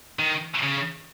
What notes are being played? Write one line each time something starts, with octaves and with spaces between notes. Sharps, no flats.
D#3
C#3